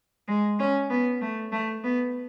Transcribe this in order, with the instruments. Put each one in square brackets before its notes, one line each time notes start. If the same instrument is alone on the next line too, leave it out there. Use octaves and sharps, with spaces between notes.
[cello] G#3
C#4
B3
A3
A3
B3